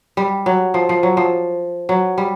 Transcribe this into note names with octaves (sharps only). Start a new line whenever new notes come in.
G3
F#3
F3
F3
F#3
F3
F#3
G3